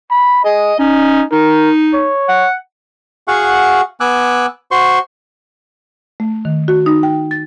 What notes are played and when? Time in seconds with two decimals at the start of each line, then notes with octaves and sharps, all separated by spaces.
0.11 B5
0.44 G#4 D#5
0.79 C#4 D#4
1.32 D#4 A#4
1.94 C#5
2.29 F#5
3.28 F#4 G#4 F5 F#5 C#6
4.00 B3 G#5 D6 E6 F#6
4.71 F#4 C5 C6 C#6
6.20 A3
6.45 D#3
6.68 F#4
6.86 D#4
7.03 G5
7.31 A6